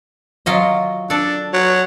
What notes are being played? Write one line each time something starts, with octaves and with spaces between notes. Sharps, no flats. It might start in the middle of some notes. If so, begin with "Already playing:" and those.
F#3 F4 D#5
D4 A4 D5
F#3